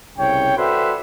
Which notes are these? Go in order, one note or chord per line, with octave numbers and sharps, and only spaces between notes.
C2 C#3 C#5 G5
F#4 A4 B4 C5 D5 E5